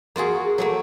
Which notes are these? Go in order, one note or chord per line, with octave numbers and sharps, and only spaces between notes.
A#3 F4 F#4 G#4
F#3 A3 A#3